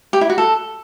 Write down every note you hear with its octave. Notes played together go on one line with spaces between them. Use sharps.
G4
E4
F#4
A4